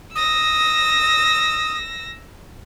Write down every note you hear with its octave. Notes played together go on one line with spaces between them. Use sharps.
D#6 E6 A#6